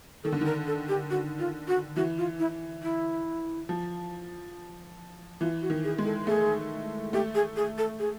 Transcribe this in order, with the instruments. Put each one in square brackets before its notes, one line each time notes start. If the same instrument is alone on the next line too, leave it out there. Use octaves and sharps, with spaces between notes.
[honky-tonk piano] D#3 [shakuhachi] A4
[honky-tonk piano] D3
[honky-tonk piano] D#3 [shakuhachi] A#4
[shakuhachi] A4
G4
F#4
F4
F#4
[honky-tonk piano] E3 [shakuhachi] F#4
[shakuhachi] F4
E4
E4
[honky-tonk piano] F3
[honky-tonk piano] E3 [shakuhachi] F4
[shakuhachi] F#4
[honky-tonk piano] D#3
[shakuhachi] G#4
[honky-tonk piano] G#3
[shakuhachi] A4
[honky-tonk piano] A3 [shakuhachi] G#4
[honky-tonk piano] A3 [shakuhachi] G4
[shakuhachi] G#4
G#4
A4
G#4